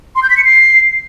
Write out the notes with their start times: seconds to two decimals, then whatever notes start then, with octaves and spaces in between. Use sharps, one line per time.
0.16 C6
0.23 G6
0.30 B6
0.37 C#7
0.44 C7